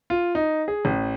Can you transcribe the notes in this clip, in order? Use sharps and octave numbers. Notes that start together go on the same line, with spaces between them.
F4
D#4
G#4
A1